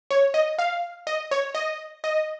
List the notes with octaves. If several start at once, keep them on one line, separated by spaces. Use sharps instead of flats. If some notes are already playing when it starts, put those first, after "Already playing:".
C#5
D#5
F5
D#5
C#5
D#5
D#5